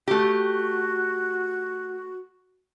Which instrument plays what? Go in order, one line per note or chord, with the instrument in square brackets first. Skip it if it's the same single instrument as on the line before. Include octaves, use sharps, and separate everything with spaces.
[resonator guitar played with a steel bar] A3 G4 [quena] F#4